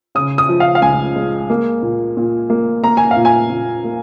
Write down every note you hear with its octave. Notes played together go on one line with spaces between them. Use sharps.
C#3 D#6
D#6
F3
F5
F5
C#2 G#5
G#3
A#3
A#2
A#2
A#3
A#3 A#5
G#5
F5
A#2
G#5
A#2
A#3